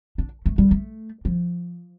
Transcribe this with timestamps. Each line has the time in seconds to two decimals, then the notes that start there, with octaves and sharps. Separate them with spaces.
0.18 D4
0.46 A3
0.58 G3
0.71 A3
1.25 F3